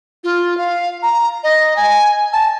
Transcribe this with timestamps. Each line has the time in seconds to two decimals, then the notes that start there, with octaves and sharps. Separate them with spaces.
0.24 F4
0.57 F5
1.03 A#5
1.44 D#5
1.76 G#5
2.33 A5